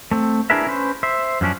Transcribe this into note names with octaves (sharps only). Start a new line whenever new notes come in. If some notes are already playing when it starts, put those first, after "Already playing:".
A3 C4
D4 E4 G#4 A#4 B4 E5
C#4 B4 C5
C5 E5
F#2 F3 C#4 D4